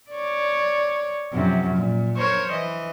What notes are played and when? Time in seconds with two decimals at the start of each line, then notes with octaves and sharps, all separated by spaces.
0.11 C#5 D5
1.33 F#2 C3 F3
1.74 A#2
2.17 A#4 C5 C#5
2.50 E3 D#5